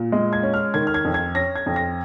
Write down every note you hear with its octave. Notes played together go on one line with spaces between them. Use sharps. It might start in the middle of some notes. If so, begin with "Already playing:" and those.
Already playing: A#2
G#3
G#6
C#4
F6
D#3 G#6
F6
G#6
F2
G#6
C#4 A#6
G#6
F2
A#6